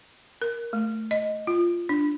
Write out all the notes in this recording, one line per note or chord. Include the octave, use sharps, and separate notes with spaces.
A#4
A3
D#5
F4
D4